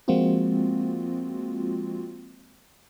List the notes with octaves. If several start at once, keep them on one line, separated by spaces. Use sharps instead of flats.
F3 G#3 A#3 C4 F4 F#4